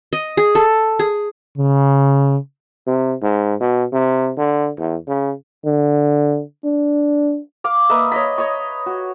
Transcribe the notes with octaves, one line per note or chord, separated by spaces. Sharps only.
D#5
G#4
A4
G#4
C#3
C3
G#2
B2
C3
D3
E2
C#3
D3
D4
F5 D6
A#3 B4 D#5 E5
C#5 D#5 B5
C#5 D#5 C#6
F#4